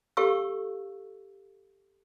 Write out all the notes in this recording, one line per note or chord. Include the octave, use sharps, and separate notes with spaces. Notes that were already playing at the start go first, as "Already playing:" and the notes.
G4 A4 F5 C#6 E6